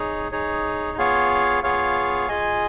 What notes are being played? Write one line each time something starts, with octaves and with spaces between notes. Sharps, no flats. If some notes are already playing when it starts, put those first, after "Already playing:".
Already playing: D#4 G#4 C#5
D#4 G#4 C#5
B3 F4 G#4 C#5 F5
B3 F4 G#4 C#5 F5
F4 G#4 D#5 G#5